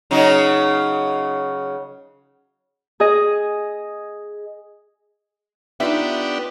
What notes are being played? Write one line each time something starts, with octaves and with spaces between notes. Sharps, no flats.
C#3 F#3 D#4
G#4 D#5
B3 D4 D#4 F4 G4 E5